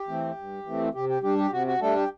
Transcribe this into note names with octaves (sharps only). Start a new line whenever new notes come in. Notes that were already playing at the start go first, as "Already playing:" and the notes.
Already playing: G4
E3 A3 C4
G2
E3 A3 C4
C3 G4
G4
G3 D4 G4
G4
C3 F#4
F#4
G3 A3 D4 A4
G4